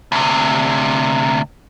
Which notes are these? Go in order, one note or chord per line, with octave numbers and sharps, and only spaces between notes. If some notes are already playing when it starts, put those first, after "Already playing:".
D2 C3